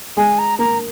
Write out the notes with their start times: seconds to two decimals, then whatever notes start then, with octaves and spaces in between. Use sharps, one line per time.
0.17 G#3 G#5
0.38 A#5
0.59 A#3 A#5